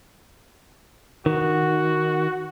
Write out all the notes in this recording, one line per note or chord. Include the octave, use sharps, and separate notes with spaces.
D#3 F#4